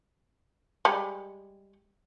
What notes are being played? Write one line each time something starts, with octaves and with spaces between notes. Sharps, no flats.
G3 G#3